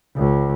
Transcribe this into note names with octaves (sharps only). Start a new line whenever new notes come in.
C#2